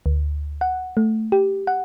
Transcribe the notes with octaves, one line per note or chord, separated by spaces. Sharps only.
D2
F#5
A3
G4
F#5